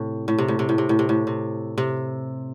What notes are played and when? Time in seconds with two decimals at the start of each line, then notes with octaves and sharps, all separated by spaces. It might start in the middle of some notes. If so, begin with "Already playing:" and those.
Already playing: A2 C3
0.28 A2
0.38 C3
0.48 A2
0.59 C3
0.69 A2
0.78 C3
0.89 A2
0.99 C3
1.09 A2
1.27 C3
1.78 C3